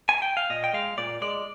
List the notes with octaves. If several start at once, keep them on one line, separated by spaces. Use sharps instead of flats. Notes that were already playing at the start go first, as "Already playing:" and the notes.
G#5
G5
F5
A#2 D#5
G5
G#3 F5
A#2 D5
G#3 D5